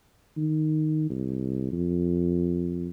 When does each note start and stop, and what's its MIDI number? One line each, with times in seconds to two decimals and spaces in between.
0.37 1.05 51
1.10 1.68 36
1.72 2.89 41